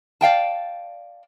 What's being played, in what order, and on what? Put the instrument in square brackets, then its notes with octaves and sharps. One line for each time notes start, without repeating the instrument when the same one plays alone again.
[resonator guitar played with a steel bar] D5 F5 G5 A5